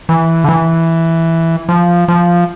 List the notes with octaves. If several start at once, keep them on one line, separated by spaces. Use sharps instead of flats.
E3
D3
E3
F3
F3